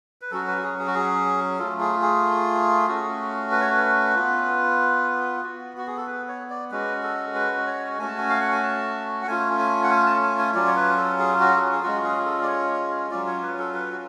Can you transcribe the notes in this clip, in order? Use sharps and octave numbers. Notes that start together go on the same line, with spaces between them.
B4
F#3 C#4 F#4 A4
B4
F#4
G#4
G#4
F#4
G#4
A3 F4 A4
G#4
G#4
A3 C#4 F#4
B4
C#5
B4
B3 F4
B3 F#4
F#4
G#4
A4
B4
C#5
D5
G#3 C#4 F#4 B4
A4
B4
C#5
A3 C#4 F#4 G#5
A5
G#5
F5
F#5
G#5
A5
F#5
A3 C#4 F4 G#5
G#5
F#5
G#5
A5
G#5
G#5
F#3 C#4 F4 D5
C#5
B4
A4
G#4
F#4
A4
G#4
G#4
G#3 C#4 F4 F#4
G#4
A4
D5
C#5
F#3 C#4 F4 D5
C#5
B4
A4
B4
F#4